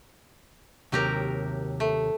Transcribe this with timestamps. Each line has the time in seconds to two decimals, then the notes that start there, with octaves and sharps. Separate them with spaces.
0.92 D#2 C3 F#3 G4 A#4
1.80 A3